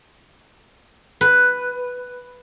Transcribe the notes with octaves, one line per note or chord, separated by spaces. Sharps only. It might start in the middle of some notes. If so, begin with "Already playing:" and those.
B4